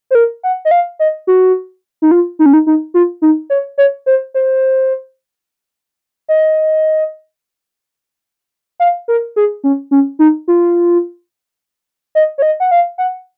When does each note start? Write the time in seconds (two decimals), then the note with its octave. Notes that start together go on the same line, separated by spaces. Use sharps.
0.11 C5
0.15 A#4
0.43 F#5
0.65 D#5
0.71 F5
0.99 D#5
1.27 F#4
2.02 D#4
2.11 F4
2.39 D#4
2.46 C#4
2.53 D#4
2.67 D#4
2.94 F4
3.22 D#4
3.50 C#5
3.78 C#5
4.06 C5
4.34 C5
6.28 D#5
8.80 F5
9.08 A#4
9.36 G#4
9.64 C#4
9.91 C#4
10.19 D#4
10.48 F4
12.15 D#5
12.38 C#5
12.42 D#5
12.60 F#5
12.71 F5
12.98 F#5